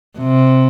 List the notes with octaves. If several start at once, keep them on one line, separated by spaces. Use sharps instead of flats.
C3